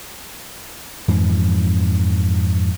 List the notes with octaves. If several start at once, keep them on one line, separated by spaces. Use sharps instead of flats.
F2 G#2 E3 F3